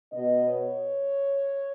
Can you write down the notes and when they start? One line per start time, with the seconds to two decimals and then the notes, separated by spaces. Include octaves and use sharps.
0.12 B2 B3 D#5
0.49 C#5